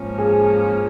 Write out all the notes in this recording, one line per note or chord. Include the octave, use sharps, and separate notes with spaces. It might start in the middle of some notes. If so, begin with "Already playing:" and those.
Already playing: G#2 F3 A#3 C#4
G#4